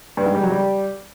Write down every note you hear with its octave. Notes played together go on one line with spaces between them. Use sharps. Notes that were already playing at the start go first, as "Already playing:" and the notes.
G2
G#2
G3
F#3
G3